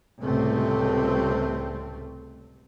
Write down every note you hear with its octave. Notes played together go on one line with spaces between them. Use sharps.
C#2 A2 C3 G3 A3 C4